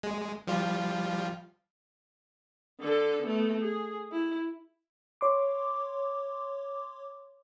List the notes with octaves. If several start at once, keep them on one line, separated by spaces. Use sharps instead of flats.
G#3
F3 G3 F4
D3 A4
A3 B3
G#4
E4
C#5 C6 D6